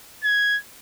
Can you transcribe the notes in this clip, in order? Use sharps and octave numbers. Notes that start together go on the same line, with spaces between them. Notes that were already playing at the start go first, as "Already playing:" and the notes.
G#6